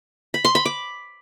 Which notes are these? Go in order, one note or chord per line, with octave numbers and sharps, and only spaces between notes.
B5
C6
B5
D6